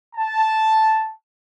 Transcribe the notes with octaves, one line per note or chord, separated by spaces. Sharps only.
A5